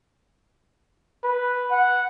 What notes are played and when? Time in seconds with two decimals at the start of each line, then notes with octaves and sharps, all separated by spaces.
1.24 B4
1.71 F#5